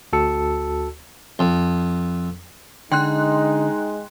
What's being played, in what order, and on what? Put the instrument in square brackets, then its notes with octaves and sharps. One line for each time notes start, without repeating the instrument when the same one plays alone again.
[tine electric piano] D2 F#4 A4 A5 E6 C#7
[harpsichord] F2
[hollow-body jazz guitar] D3 [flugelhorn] G#3 [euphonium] D#4 [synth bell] G5 C6 F#6